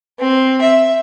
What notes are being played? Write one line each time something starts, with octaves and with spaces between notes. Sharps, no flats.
C4
E5